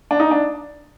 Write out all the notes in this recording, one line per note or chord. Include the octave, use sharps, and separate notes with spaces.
D4
D#4
D4